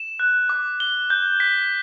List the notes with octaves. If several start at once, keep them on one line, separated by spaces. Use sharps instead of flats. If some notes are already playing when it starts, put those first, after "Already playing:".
Already playing: E7
F#6
D6
G7
G6
B6